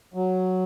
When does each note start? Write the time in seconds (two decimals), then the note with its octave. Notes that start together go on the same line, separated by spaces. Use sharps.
0.14 F#3